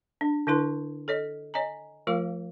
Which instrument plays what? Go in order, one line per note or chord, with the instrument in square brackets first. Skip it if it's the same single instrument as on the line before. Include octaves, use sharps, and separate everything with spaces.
[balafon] D4
D3 D4 E4 B4 C6
A4 C#5 D#5
C#5 D#5 G#5 A#5
F3 A3 F4 A#4 F5 C#6